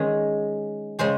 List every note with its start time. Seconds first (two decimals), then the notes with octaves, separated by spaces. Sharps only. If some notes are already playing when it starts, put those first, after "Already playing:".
Already playing: D#3 G#3 C#4 G#4 C5
0.99 C#3 G#3 C#4 G#4 C5